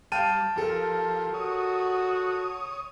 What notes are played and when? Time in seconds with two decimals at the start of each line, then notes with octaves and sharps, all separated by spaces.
0.12 G3 F5 G5 A5 F6 D#7
0.56 F3 G4 A4 A#4
1.34 F#4 C#5 D#6